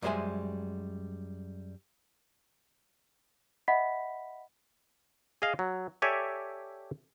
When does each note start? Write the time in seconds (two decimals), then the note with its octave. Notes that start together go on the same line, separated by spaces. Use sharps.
0.02 F#2 G3 G#3 C5 E5 G#5
3.68 D#5 E5 F#5 B5 B6
5.42 G#4 D#5 F5
5.59 F#3
6.02 G4 A4 C#5 D5 E5 G#5